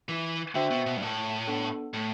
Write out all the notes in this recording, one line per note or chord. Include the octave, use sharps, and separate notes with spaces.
E3
D3 F#4 C5 E5 G5
B2
B2
G2
A2
B3 D4 A4
A2